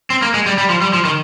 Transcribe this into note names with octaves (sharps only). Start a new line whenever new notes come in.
C4
A#3
G#3
G3
G3
F3
G3
F3
D#3